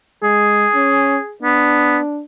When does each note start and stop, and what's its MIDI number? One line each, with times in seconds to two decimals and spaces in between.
0.23 0.66 56
0.23 1.34 68
0.74 1.18 61
1.42 1.99 59
1.42 2.22 62